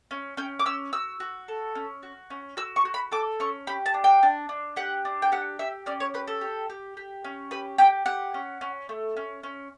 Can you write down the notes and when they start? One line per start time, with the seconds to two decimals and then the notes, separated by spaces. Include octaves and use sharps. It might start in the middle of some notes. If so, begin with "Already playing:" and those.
0.11 C#4
0.37 C#4 G5
0.59 D6
0.66 C#4 E6
0.93 F#4 E6
1.20 F#4
1.48 A4
1.75 C#4
2.03 F#4
2.30 C#4
2.57 F#4 E6
2.76 C#6
2.85 F#4
2.94 B5
3.12 A4 D6
3.40 C#4 C#6
3.67 G4 B5
3.86 A5
3.94 D4
4.04 G5
4.23 D4
4.49 D4
4.76 G4 F#5
5.05 D4
5.22 G5
5.32 G4 F#5
5.59 G4 E5
5.86 C#4 D5
6.00 C#5
6.14 G4 B4
6.27 A4
6.41 G4
6.70 G4
6.97 G4
7.24 C#4
7.51 G4 B4
7.78 G4 G5
8.06 G4 F#5
8.34 C#4
8.61 C#4
8.89 A3
9.17 C#4
9.43 C#4